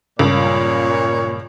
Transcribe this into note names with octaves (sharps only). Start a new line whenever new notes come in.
C#2 G2 A#2 C#5